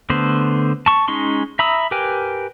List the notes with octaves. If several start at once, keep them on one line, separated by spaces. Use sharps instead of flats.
D3 A3 B3 C5
A5 C#6
G#3 C#4 D#4 C6 C#6
E5 A#5 B5 D#6 E6
G4 A#4 B4 G5 G#5